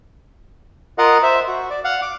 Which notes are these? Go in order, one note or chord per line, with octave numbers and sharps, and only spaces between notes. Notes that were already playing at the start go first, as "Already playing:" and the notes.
F4 A#4 D#5 F5 F#5
C5 E5
F#4
D5
F5 F#5
D6